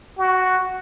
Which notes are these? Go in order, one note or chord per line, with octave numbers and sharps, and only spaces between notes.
F#4